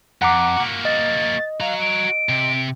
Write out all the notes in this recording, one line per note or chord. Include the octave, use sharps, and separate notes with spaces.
F2 F#5 A#5 D6
A#3 F#4
D#5 A6
F#4 F5 A#5
D7
C3